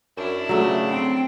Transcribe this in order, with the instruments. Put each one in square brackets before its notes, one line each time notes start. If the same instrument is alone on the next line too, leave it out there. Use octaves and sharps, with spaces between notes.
[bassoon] F#2 [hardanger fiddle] D4 E4
[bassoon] C#3 [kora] F#3 A3
[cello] C4 G5